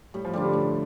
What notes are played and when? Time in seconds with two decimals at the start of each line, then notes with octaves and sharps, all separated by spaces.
0.14 A2 G3
0.25 F3
0.34 D3 G3 D4 F4
0.44 D3
0.53 A2